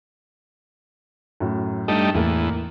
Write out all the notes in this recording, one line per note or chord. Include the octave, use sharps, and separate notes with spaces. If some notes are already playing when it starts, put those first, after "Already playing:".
F#2 A2
G2 G3 A3 D#4
E2 A2 A#3 A#4